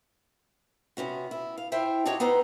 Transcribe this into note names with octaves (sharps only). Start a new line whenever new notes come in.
C3 B3 C#4 F#4
E4
F5
E4 C5 E5 G5
D4 D#4 F#4 G4 C#5 D#5
B3 D#4 A4 B4 C5 A#5